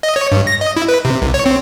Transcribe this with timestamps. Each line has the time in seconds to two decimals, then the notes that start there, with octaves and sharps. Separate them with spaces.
0.03 D#5
0.16 C#5
0.32 G2
0.47 A#6
0.61 D#5
0.77 E4
0.88 B4
1.05 C3
1.22 C2
1.34 C#5
1.46 C4